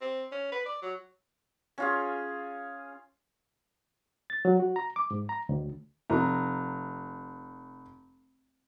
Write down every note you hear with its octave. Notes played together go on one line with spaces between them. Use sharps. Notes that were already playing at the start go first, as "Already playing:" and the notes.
C4
C#4
B4
D5
F#3
C#4 F4 G#4
A6
F#3
F#4
A#5
D6
G#2
A#5
D2
F1 A#5